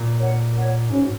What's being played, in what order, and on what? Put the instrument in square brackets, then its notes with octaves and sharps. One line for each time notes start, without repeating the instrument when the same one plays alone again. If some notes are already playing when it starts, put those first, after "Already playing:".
Already playing: [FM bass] A#2
[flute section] A#4 C#5 F#5
A#4 C#5 F#5
[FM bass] G#2 [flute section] C#4 F#4 C#5